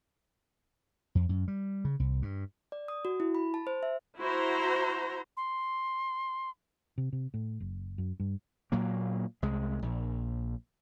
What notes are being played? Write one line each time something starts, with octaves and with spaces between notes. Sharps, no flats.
F2
F#2
G3
C#3
C2
G2
D5
D#6
F#4
E4
B5
A5
C5
E5
E4 F#4 C5 A#5
C6
C3
C3
A2
F#1
F#2
G2
A#2 F#3 A#3
C2 G#3
A#1